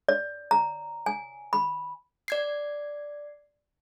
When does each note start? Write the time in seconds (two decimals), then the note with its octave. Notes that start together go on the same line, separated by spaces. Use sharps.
0.09 D5
0.51 A#5
1.06 G#5
1.53 B5
2.28 D5 G#6 C7